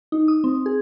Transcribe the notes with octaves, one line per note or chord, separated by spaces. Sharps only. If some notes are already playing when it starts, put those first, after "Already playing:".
D#4
D#6
C4
G#4